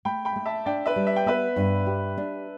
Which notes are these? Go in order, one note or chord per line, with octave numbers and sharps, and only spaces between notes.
A3 G5 B5
G5 B5
A3
E5 A5
D4 D5 G5
B4 E5
G3
E5
G5
B3 B4 E5
G2
G4
D4